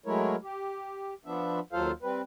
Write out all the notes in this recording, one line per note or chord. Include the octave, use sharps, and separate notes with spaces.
F#3 G#3 A3 E4 A#4 C#5
G4
F3 B3 D4 E5
D#2 F#3 F4 A4 C5 F5
G3 C4 B4